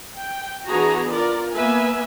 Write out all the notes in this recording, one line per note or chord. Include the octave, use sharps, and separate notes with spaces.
G5
E3 B3 D4 F#4 G#4 A#5
F4 A#4 D5
A#3 B3 B4 E5 G#5